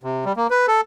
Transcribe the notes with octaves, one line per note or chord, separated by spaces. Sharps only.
C3
G3
A#3
B4
A4